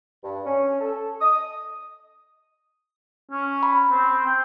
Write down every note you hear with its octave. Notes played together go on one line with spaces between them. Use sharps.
G2
C#4
A4
D#6
C#4
B5
C4
G5